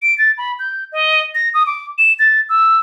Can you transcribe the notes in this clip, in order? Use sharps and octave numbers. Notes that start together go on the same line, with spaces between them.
D7
A6
B5
G6
D#5
A#6
D#6
D6
E7
A6
E6